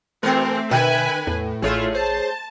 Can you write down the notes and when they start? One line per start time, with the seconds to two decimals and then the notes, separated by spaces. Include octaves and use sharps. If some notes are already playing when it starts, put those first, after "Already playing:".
0.23 B2 E3 A3 C4 A#4
0.71 B2 D3 B4 E5 G#5
1.27 E2 A2
1.62 A1 A3 F4 G#4 C#5
1.95 C5 A5